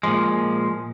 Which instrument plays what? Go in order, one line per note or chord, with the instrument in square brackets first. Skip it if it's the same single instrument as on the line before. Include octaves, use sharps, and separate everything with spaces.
[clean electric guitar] A#2 F3 G#3